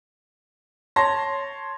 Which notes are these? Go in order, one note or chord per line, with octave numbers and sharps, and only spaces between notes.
C#5 A5 C6 A#6